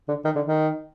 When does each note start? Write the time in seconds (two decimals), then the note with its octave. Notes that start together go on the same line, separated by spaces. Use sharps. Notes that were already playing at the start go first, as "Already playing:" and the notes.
0.08 D3
0.25 D#3
0.36 D3
0.46 D#3